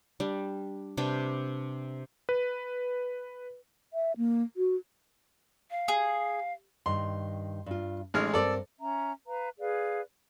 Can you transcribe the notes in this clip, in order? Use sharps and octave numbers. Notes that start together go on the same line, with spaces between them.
G3 D4
C3 D4 B4 G5
B4
E5
A#3
F#4
F5
G#4
G2 D#3 C6
G2 F4
A1 G#3 D#4 F6
G2 C4 A4 A#4 D5
C#4 E5 A#5
B4 F5 A#5
G#4 B4 D5 F5